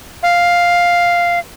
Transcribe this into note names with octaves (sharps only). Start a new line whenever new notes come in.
F5